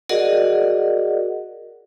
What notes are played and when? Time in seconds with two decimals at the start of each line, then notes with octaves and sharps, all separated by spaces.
0.09 F#4 G#4 A#4 D5 D#5 F#5